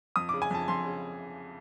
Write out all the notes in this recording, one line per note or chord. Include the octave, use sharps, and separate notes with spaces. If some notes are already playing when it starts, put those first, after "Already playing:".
F2 D#6
C#3 D6
G#5
F2 A5
F2 C6
C#3